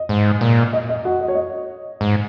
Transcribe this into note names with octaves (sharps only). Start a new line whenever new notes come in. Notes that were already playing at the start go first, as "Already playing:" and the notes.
Already playing: D#5
G#2
A#2
D#5
D#5
F#4 F#5
D#5
C#5
D#5
G#2